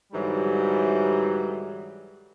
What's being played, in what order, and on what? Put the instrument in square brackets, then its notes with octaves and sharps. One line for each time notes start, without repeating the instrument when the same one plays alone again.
[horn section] G#2 D3 E3 F#3 G3